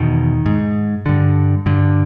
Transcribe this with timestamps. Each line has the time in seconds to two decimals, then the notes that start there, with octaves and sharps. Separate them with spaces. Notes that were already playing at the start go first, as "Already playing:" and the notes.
Already playing: E2 B2 D#3
0.46 G#2
1.06 G2 D3
1.66 G2 D3